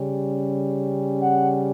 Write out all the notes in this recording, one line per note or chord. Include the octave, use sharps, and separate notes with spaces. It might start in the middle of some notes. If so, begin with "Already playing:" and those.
Already playing: C#3 G3 C#4
F#5